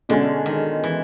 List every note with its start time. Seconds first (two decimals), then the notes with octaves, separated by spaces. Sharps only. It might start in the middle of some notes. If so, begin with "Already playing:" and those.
0.09 B2 D3 G#3 C#4
0.46 D#3
0.84 E3